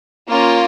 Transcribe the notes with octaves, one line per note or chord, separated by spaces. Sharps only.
A#3 C#4 F4